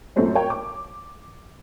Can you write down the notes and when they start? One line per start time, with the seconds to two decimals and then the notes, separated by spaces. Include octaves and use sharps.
0.16 F#2 A#2 F#3 A3 C4 C#4
0.35 A#4 C#5 G5
0.50 D6